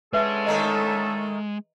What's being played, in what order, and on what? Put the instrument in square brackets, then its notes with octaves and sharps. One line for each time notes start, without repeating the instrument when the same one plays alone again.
[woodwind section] D3 C#4 A4 [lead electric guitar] G#3 [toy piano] B4 E5
[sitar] D#3 A3 A#3 [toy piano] D#5 A#5